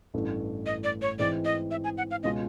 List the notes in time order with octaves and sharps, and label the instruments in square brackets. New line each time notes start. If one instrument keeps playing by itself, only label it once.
[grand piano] A1 G2 E3 A3
[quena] D#5
D5
C#5
[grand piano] G#2 E3 G#3 C4 [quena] D5
[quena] D#5
E5
G#5
F#5
F5
[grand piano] C#2 B2 G#3 C#4 F4 [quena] D#5